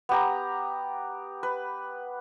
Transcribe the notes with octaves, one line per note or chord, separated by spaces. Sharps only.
B3 G4 A#5
B4